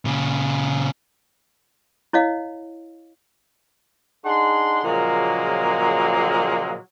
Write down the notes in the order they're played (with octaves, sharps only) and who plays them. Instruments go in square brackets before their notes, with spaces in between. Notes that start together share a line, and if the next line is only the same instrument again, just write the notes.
[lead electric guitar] A#2 C#3
[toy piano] E4 C#5 D#5 F5
[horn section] D4 D#4 G#4 F#5 C6
A#2 C#3 F3 F#3 G#3 A#3